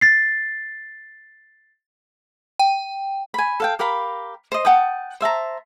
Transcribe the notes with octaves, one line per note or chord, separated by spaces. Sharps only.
A6 C7
G5
G#5 B5
A4 F5 G5
G4 A#4 F5 B5
C5 D#5
F#5 G5 A5 D#6
C5 E5 A5 A#5